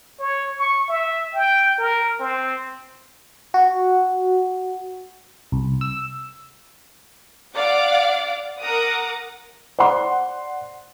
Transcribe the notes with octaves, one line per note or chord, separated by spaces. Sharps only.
C#5
C#6
E5
G5
A#4
C4
F#4
C2
E6
D5 F5 F#5 D6
A#4 F#5 A#5 D6 D#6
C5 D5 F#5 C6